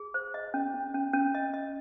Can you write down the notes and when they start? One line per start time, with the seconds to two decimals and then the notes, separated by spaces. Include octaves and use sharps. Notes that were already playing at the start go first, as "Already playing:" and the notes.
Already playing: G#4
0.14 C5
0.34 D#5
0.54 C#4
0.74 C#4
0.95 C#4
1.13 C#4
1.35 D#5
1.54 D#5